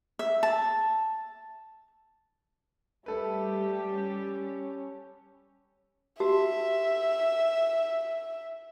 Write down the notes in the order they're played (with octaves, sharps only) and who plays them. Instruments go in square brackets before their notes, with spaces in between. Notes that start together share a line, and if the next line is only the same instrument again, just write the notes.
[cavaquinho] E5
A5
[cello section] G3 G4 [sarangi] A3 [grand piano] A4 B4
[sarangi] C#4
[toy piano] F#4 G4 A5 [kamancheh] E5